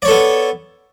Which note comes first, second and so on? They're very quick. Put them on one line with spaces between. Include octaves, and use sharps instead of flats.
D5 C#5 A4 B3